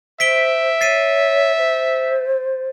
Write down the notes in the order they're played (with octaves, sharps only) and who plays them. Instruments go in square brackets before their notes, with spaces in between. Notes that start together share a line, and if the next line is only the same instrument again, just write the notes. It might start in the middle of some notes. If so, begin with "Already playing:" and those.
[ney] C5 [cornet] E5 [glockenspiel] B6 D7 G7
[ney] C#5 [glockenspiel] A6 C7 D#7
[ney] C5